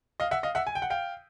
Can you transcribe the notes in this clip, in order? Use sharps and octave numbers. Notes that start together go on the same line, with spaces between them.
D#5 F5
E5 F#5
D#5 F5
E5 F#5
G#5
G5
F#5
F5 G5